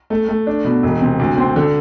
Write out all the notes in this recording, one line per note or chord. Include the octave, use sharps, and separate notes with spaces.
A3
A3
D4
B2
E1
C3
D2
C4
D3